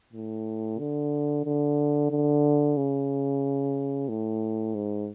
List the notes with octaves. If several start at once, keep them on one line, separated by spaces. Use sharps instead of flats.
A2
D3
D3
D3
C#3
A2
G#2